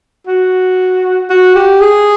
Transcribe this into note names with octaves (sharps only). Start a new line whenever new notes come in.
F#4
F#4
G4
G#4